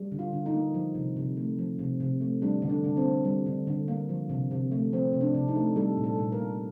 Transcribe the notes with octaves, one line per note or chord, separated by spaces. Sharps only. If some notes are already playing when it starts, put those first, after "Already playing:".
Already playing: G3
D3
F4
D3
D#4
A#3
F3
C3
C3
A3
F3
C3
C3
A3
G3 D4
D3
D4
D3
C4
A#3
G3
D3
D3
A#3
F3
C3
C3
A3
F3 C4
C3
D4
C3
D#4
A3
G3 A4
A#2
A4
A#2
A#4
A#3